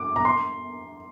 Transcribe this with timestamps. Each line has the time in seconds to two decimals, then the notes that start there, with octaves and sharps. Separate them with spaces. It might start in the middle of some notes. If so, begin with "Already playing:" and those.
Already playing: D6
0.16 A#5
0.25 C6